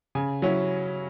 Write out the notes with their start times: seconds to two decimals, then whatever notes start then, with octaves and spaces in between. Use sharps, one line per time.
0.15 C#3 G#5
0.42 F#3 C#4 E4